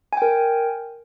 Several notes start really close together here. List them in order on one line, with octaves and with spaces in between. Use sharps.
G#5 G5 A#4